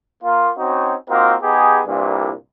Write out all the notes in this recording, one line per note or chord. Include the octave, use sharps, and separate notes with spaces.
A#3 F4
C4 C#4 D#4 F#4
A#3 C4 D#4 F4 F#4 A#4
B3 D#4 G4 G#4
C2 G2 A#2